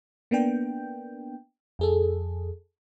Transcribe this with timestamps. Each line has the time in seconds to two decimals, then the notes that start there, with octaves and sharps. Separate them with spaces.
0.31 A#3 B3 D4 G5
1.79 F2 G#4 A4